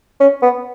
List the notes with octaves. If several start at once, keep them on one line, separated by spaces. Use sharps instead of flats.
C#4
B3